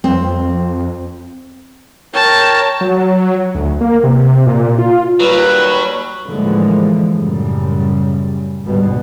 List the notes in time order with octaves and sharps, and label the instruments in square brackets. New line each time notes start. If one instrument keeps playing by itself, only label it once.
[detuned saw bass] F2 [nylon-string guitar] C4
[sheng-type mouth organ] A#4 C#5 G5 [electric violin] A5
[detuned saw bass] F#3
D2
A#3
C3
A#2
F4
[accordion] D#2 G3 B4 [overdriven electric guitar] F#3
[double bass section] A2 D3 E3 F3 G#3 A#3
F#2 A2 C#3 G3
G#1 D2 G2 B2 G3